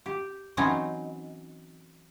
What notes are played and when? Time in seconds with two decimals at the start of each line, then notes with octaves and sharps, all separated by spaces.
0.06 G4
0.57 E3 F#3 C4 C#4 D#4 C5